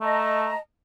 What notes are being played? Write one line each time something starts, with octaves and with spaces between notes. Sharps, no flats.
A3 D#5 A5 A#5